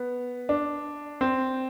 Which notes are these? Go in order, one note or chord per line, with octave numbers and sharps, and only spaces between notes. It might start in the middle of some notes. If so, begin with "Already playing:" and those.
Already playing: B3
D4
C4